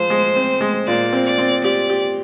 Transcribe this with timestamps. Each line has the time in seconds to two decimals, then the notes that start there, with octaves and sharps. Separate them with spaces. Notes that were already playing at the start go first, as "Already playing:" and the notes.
Already playing: F3 G#3 C5
0.10 G#3
0.36 C4
0.61 G#3
0.87 A#2 D5
1.13 C4
1.26 D5
1.38 C4
1.64 G4 D5
1.90 G4